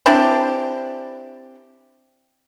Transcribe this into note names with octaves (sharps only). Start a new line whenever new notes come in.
C4 D4 E4 G4